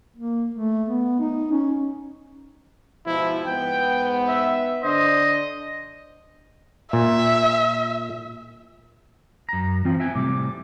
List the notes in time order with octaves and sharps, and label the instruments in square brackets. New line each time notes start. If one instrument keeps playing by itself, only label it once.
[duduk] A#3
A3
B3
D#4
C#4
[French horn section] G#2 B2 F3 [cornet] E4
[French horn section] G#2 B3 [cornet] G5
[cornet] E5
[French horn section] D3 D4 [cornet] C5 [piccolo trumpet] D#5
[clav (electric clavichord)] A#2 [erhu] E5
[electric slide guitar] F#2 A#5
[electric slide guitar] E3 F3 F4 [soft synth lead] C4
[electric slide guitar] E5 G5 G#5
[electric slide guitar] A2 C3 G3 [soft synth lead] D6